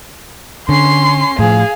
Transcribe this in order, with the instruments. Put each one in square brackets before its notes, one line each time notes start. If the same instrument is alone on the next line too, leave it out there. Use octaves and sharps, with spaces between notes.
[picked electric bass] D3 [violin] C#4 C7 [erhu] C6
[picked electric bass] A2 F3 [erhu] G#4 [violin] F5